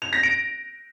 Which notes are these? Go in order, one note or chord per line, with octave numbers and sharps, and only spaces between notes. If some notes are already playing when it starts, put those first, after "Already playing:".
F7
A#6
D7